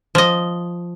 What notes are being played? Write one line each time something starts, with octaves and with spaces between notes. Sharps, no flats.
F3 D#5